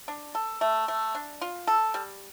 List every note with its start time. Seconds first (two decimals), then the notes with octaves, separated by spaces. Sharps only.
0.08 D4
0.35 A4
0.61 A3
0.88 A3
1.15 D4
1.41 F4
1.67 A4
1.94 G3